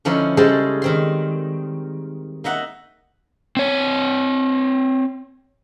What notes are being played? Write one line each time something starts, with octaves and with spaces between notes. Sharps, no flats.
D3 F3 C#4 D#4 E4
C#3 G3 G#3 G#4 A4 C5
D#3 C4 C6
A#3 D#4 E5 F#5
C4 C#5